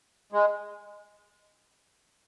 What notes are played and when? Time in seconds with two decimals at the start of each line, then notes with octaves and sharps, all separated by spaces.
0.32 G#3